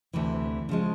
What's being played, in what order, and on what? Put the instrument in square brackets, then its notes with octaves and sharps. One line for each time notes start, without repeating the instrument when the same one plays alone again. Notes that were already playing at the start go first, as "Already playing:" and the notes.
[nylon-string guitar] D2 C3 E3
C#3 F3 G#3